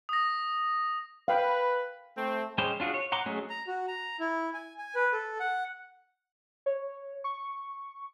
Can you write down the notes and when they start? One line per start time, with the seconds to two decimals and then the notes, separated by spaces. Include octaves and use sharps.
0.09 D#6 A#6
1.28 B4 F5 G5
2.16 A3 C4
2.58 G3 G#3 C#4 G4 C5
2.80 D4 F4 F#4 G#4
2.94 C#5
3.12 F#5 A#5 C6 D6
3.26 F#3 G#3 A3 C#4 G#4
3.49 A#5
3.67 F#4
3.88 A#5
4.20 E4
4.54 G#5
4.78 G#5
4.95 B4
5.12 A4
5.40 F#5
6.66 C#5
7.24 C#6